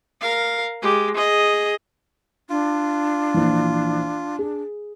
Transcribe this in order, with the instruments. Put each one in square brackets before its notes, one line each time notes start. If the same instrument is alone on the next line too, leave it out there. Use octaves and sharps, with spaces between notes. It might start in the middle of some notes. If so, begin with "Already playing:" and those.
[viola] A#4 F5
G#3 G4
G#4 D#5
[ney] D4 [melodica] F4
[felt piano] A#1 E3
G#4